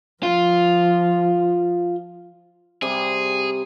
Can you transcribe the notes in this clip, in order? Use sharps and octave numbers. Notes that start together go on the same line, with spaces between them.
F3 F4
C3 G3 G#4 D6